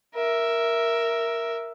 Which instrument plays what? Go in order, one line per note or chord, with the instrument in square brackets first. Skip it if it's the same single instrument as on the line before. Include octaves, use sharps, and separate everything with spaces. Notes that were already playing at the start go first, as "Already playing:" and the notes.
[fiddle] A#4 E5